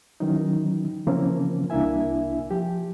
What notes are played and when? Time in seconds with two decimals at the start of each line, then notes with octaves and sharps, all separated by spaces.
0.20 D#3 E3 F#3 C#4 D#4
1.07 C#3 E3 F3 A#3 C4 C#4
1.70 C2 A#3 D4 E4 E5 G#5
2.51 F3 G4